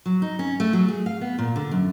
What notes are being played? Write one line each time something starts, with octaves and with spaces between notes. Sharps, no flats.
F#3
D#4
C#4
A3
F#3
G#4
F5
B3
A#2
D3
F#2